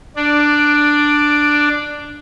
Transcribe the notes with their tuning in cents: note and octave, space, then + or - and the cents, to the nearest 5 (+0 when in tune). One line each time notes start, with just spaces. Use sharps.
D4 +5 D5 +0